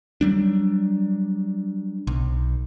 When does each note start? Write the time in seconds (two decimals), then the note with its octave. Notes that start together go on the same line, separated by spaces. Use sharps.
0.21 F#3 G3 D4
2.07 B1